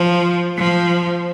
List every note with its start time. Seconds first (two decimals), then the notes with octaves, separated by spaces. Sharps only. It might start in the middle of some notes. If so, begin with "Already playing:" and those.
Already playing: F3
0.58 F3